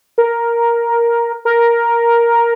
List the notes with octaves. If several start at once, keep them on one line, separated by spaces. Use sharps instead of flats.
A#4
A#4